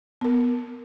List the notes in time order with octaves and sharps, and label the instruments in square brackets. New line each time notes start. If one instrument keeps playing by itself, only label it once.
[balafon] B3 A#4